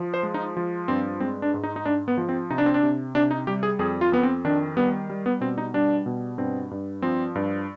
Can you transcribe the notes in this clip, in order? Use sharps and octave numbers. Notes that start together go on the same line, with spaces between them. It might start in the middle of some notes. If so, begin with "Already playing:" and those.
Already playing: F3
C5
G#3
D#4
F3
G2 C4
G#3 C4
D4
G#2
D#4
D#4
G#2 D4
B3
F3
C4
C3 D#4
D4
C4
D4
C3
C3 D4
D#4
G3 G4
G#4
F2 G#4
F4
F2 B3
C4
D#3 D4
G3 B3
G3
B3
B2 C4
D#4
G3 D4
B2
G2 C4
G2
F3 C4
G2